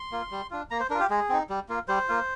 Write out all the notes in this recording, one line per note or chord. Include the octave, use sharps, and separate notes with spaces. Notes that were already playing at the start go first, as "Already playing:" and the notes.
Already playing: C6
A#3 F4
G3
D4 F4
A#3 A#5
C5
D4 F4 A#4
G4
G#3 G#4
C4 D#4
G3
A#3 F4
G3 C5
A#3 F4